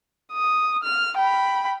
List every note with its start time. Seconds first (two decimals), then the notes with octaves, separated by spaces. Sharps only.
0.33 D#6
0.84 F6
1.17 G5 B5